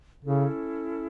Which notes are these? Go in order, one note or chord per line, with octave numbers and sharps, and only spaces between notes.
C#3 C#4 E4 A4